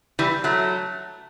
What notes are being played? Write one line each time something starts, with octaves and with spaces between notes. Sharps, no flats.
E3 G3
F#3 A3